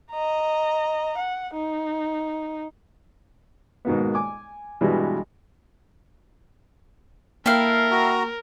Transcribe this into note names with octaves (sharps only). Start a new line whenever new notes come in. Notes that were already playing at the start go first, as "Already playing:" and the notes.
D#5 A#5
F#5
D#4
G#2 B2 D#3 A#3 B3
G#5 D6
G2 B2 E3 G3 G#3
A#3 E4 A4 A#4 F5 G5
F#4 A#5